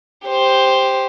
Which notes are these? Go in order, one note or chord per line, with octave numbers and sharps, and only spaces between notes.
G4 C5